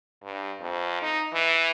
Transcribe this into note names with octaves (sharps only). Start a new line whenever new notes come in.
G2
F2
D#4
E3